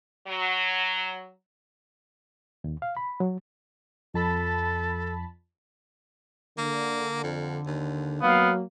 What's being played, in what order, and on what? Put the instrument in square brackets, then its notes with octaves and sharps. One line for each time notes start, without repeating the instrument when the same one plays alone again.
[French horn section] F#3
[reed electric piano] D#2
F5
B5
F#3
[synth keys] F2 A5 B5 [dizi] A4
[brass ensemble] D3 [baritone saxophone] A#3
[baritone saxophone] F2
D#2
[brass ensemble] F#3 A#3 [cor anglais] B3 [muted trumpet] F5